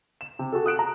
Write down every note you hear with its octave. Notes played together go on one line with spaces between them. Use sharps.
E7
C3
F#4 G#4 A4
D#6 F#6 D7 E7
A#5